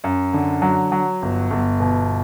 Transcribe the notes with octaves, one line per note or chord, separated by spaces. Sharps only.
F#2
D3
F#3
F#3
G1
G1
B2